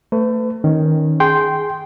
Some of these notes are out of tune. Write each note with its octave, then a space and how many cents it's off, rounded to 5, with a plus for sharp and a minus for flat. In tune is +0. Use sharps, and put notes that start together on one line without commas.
A3 +25 B4 +40
D#3 +5 C#4 +0
G#4 +0 G5 -10 C6 +0